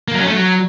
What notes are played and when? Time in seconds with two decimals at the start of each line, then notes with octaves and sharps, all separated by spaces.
0.08 A#3
0.14 F#3
0.21 C#4
0.27 A3
0.33 F#3